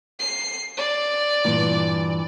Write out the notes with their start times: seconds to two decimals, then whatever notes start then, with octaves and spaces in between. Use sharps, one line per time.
0.20 C7
0.78 D5
1.45 G2 A#2 E3